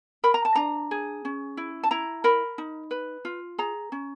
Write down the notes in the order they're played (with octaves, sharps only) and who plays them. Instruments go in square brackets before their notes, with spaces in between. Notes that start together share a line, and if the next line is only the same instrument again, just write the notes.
[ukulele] A#4 B5
A#5
A5
D4 A#5
G#4
C#4
E4
A5
E4 A#5
A#4 B5
D#4
B4
F4
G#4 A#5
C#4